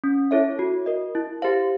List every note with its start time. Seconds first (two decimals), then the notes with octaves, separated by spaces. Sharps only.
0.04 C#4
0.31 E4 A4 C#5 E5
0.59 F#4
0.86 A#4 D#5
1.15 E4
1.42 G4 C5 F5